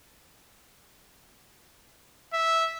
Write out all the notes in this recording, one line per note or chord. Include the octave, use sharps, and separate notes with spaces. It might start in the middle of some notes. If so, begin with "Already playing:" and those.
E5